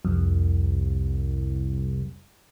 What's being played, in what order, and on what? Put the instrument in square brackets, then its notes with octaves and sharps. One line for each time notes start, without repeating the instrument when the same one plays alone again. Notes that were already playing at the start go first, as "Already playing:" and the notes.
[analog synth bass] C2 [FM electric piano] F2